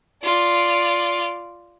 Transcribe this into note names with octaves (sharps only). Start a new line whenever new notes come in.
F4 D5